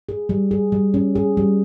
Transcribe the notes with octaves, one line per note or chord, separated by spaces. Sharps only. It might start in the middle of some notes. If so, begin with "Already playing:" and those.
G#4
G3
G#4
G3
C#4
G#4
G3